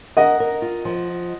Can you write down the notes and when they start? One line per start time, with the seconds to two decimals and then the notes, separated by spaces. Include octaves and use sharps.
0.17 A#4 D#5 F#5
0.40 A#4
0.62 F4
0.85 F3